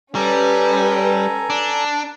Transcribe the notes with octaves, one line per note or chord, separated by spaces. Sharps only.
G3 C#4 A4 B4 G#5 A#5
D4